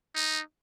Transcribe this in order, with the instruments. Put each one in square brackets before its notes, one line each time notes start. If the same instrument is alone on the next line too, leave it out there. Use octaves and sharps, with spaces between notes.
[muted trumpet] D#4